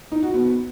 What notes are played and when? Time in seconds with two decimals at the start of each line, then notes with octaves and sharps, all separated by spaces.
0.12 D#4
0.23 F#4
0.34 B3